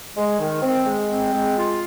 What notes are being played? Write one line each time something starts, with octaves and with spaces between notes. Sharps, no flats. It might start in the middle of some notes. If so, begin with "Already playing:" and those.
G#3
D#3
C4
G#3
C4
G#3
F4